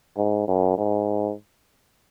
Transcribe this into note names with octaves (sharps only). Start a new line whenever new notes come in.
G#2
F#2
G#2